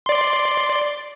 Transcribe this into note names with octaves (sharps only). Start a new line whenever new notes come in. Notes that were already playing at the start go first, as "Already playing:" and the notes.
D5 C6